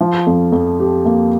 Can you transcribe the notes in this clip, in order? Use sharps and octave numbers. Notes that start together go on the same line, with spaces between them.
F3
F2
F2
G4
A#3